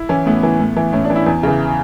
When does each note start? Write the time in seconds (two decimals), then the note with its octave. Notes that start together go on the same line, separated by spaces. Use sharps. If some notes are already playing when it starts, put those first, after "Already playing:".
Already playing: E4
0.09 E3 C#4
0.26 A2 B3
0.43 E3
0.60 A2
0.77 E3
0.93 A2 C#4
1.04 D4
1.10 E3
1.16 E4
1.26 E2
1.43 C#3 E3